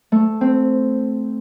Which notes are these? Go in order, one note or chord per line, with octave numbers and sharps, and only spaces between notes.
A3
C4